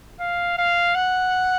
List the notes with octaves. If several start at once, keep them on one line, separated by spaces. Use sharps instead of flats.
F5
F5
F#5